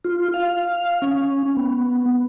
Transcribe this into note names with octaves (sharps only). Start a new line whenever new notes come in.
F4
F5
C#4
B3